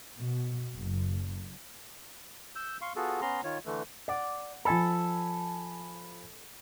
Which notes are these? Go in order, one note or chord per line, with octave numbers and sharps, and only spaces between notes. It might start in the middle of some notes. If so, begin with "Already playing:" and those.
B2
F#1
E6 G6
F5 C6 C#6
B3 F4 F#4 G#4 A4
B3 C#4 A#5 C6
D#3 F4 C#5
D3 E3 A3
D5 F#5
F3 A4 G#5 B5